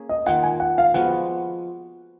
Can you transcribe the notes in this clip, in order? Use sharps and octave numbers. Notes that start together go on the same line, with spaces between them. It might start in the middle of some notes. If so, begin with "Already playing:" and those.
Already playing: A#3 C#4 G#4
D#5
D#3 A#3 F4 F#5
G#5
F#5
F5
F3 G#3 B3 F#4 F#5